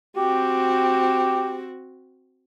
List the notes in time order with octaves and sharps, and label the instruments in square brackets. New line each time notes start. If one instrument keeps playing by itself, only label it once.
[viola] C4 F#4 [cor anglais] G4